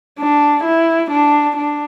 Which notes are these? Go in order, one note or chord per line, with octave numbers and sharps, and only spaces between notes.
D4
E4
D4
D4